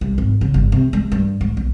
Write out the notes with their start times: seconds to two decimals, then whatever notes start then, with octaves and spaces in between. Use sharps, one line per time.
0.01 C2
0.18 G#1
0.41 C#3
0.54 G1
0.72 C3
0.93 G#3
1.12 G2
1.41 G#2
1.57 B1